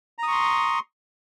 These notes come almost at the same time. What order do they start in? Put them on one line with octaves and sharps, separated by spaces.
A#5 D#6 C#6 C6